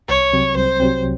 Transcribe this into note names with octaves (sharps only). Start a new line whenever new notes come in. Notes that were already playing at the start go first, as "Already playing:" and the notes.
C2 C#5
C3 F#3 C4
C2 C5
C3 F#3 C4